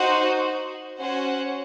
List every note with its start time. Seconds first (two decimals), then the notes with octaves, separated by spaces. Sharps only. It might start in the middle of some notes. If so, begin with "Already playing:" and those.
Already playing: D#4 F#4 C5
0.99 C#4 F#4 C5 F#5